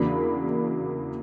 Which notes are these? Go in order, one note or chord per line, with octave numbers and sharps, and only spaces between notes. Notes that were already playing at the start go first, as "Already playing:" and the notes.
Already playing: E2 C#3 F#3 A#3 D4 B5